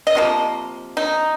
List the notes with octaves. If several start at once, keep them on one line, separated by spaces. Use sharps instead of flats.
D#5
C3 F3 A#3
D#4